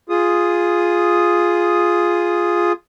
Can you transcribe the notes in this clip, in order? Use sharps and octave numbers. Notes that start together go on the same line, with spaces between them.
F4 G#4 D#6